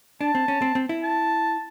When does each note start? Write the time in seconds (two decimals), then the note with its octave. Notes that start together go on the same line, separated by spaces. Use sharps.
0.21 D4 A5
0.35 C4
0.48 C#4
0.62 C4
0.75 C4
0.89 E4
1.03 A5